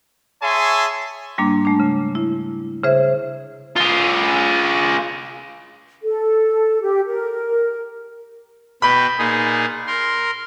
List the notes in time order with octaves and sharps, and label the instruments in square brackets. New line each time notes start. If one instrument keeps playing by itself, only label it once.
[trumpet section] G#4 C#5 E5 G#5 A5 C6
[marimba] G#2 G3 A#3 D4
G#3 A3 D4
C#3
E4
C#3 G#4 C5 E5
[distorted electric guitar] F4 G#4
[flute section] A4
G4
A#4
[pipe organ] B2 B4 G5 [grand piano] B5
[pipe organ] A#2 D#4 G#4
A#4 C6